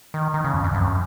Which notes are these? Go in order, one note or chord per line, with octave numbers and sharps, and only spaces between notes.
D#3
D#3
C#3
F2
F2
F#2